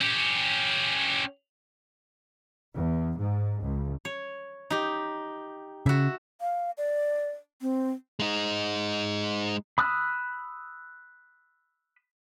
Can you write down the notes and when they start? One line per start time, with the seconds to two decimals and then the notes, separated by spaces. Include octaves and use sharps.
0.01 C#4 G4
2.74 E2
3.17 G#2
3.63 C#2
4.05 C#5
4.70 D#4 G4
5.86 C#3 F#4 E5
6.41 F5
6.78 D5
7.62 C4
8.20 G#3 D#4
9.78 B5 D#6 E6 F#6